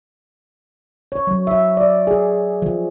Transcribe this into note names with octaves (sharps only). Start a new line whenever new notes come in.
C#5
F#3
E5
D5
G#4
F3